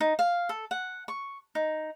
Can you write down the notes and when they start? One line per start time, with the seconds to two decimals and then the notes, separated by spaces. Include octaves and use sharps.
0.01 D#4
0.19 F5
0.49 A4
0.71 F#5
1.08 C#6
1.55 D#4